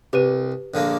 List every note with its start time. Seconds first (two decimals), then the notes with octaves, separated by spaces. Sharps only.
0.13 C2 G4 B4 D#7
0.74 A#1 D3 A#3